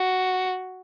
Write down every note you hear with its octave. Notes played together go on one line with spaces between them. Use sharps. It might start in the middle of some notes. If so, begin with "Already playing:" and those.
Already playing: F#4